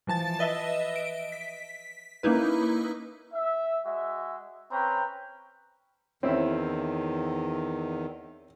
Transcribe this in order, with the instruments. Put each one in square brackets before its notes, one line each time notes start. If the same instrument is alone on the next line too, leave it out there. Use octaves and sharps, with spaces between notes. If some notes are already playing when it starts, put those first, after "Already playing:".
[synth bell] E3 F3 A5 A6
B4 D#5 E5
D7
B6
A#3 C#4 D#4 E4 B4
[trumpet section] E5
G#3 F#4 E5
C4 C#4 B4 G5 A#5
[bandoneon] E2 D#3 [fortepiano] C4 C#4 E4